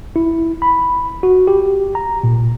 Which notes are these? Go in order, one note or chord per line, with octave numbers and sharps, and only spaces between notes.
E4
B5
F#4
G4
A#5
A#2